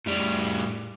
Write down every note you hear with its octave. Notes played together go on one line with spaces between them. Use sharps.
A2 G3